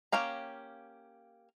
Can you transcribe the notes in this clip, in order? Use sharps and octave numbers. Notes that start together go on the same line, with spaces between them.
A#3 C#4 G4 F5 A#5